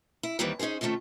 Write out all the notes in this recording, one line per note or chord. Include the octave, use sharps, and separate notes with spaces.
E4
D#2 D#3 E3 G3 C4
C#4 D#4 F4 G#4 C5
C3 D#3 F3 A3 C#4